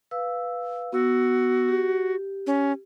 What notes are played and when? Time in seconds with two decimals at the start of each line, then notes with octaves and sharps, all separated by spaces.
0.11 B4 F5 E6
0.93 B3 F#4 E6
1.69 G4
2.47 C#4